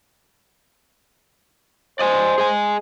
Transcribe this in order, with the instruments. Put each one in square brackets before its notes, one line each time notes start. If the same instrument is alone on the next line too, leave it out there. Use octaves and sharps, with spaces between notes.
[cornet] C5 [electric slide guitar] D5 D#5 G#5
[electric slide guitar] G#4 D#5 G#5